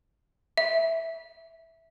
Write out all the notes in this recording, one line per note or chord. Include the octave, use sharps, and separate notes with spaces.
E5